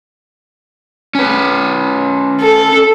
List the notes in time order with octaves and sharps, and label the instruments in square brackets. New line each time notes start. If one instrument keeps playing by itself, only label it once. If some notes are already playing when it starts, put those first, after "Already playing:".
[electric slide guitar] C#4 B4
[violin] A4